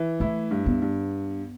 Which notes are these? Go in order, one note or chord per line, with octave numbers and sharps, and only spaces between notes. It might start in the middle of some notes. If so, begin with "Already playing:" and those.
Already playing: E3
A3 E4
G2
B3
G2